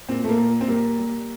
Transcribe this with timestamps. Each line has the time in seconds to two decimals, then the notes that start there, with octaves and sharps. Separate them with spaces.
0.09 A#2 C4
0.24 A3
0.29 A#3
0.38 A#2
0.61 C4
0.68 G3 A#3
0.99 G3